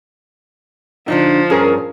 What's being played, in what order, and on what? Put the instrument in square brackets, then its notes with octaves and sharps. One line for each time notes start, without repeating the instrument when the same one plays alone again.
[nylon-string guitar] D3 D4 D#4 [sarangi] F3
[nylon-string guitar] G2 [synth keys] C#4 G#4 A#4